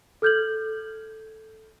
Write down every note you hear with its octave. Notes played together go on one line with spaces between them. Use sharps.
A4 F6 G6 G#6 F#7